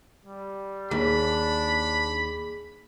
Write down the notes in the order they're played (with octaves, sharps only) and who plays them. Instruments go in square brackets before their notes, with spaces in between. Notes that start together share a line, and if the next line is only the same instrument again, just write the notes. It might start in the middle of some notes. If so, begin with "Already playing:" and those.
[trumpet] G3
[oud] D#2 [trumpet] D4 [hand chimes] G#4 [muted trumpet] B5